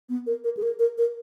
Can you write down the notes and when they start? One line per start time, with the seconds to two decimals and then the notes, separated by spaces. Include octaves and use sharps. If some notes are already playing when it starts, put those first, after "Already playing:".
0.09 B3
0.27 A#4
0.44 A#4
0.57 G#4
0.62 A#4
0.79 A#4
0.98 A#4